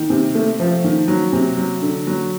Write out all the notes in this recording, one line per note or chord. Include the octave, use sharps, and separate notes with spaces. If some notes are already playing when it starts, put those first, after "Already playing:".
Already playing: D#3
C3
A3
F3
D#3
F#3
C3
F#3
D3
F#3